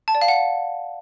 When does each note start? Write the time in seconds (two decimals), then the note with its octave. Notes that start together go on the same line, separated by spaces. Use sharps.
0.08 A5
0.15 D5
0.22 F5
0.28 F#5